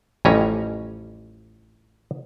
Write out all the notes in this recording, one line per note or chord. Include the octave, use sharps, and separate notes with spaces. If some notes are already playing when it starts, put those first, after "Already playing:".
A1 F2 G3 C#4 G#5 A#5